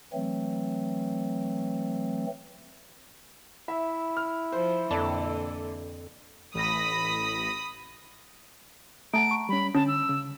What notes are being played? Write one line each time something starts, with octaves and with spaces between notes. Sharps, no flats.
E3 F#3 A3 C4
E4 E5
F6
F3 C5
F2 A#2 D3 E3 A4 D5 A5
A1 B5 D#6 A#6
A3 F#5 A5 A#5 D7
C#6
G3 C#4 B5
D3 C#4 A5
E6
C#3